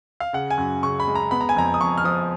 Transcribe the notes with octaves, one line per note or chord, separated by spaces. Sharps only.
F5
C#3 F#5
G#5
F#2
C#3 C#6
B5
G#3
A#5
B3 B5
A#5
G#5
F2 A#5
D#6
F2 C#6
F6
F3 D#6